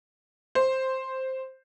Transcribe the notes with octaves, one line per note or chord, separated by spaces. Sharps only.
C5